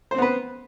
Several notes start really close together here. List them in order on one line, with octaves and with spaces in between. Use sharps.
C5 C4 B3 B4